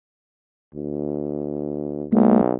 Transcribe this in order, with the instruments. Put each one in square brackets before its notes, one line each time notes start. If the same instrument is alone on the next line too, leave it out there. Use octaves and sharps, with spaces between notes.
[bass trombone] D2
[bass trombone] B1 [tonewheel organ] G#3 A#3